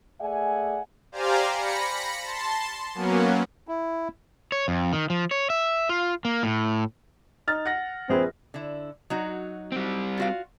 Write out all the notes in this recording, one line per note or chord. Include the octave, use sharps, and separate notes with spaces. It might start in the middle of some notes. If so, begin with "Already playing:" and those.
A3 G#4 D5 E5 F#5 G#5
G4 C5 D5 F5 G#5 A#5
B5 A#6 C#7
A5 C6
F#3 A#3 B3 C#4
E4
C#5
F2
D#3
F3
C#5
E5
F4
A#3
A2
D#4 F6 A6
F#5 A#6
A#1 C4 G#4 B4
D3 E4
F#3 D#4 F#4
G3 C4
F4 F#4 F5